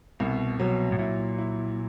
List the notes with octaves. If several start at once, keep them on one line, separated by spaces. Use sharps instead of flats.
C2 B2
B2 F#3
A2
A#2 E4
E4